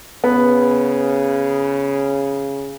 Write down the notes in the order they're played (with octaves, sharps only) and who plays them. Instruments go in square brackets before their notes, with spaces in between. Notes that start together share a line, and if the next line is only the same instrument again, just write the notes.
[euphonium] C#3 [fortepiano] B3